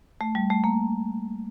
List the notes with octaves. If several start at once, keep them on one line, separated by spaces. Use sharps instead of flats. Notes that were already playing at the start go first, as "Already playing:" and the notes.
A3
G3
A3
A#3